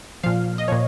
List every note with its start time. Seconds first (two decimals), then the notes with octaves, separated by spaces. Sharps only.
0.23 A#2 F3 F5
0.58 D#5
0.68 A#2 F3 C#5